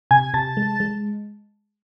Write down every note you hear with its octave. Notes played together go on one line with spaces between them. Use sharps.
C3 G#5 G#6
C3 A5 A6
G#3
G#3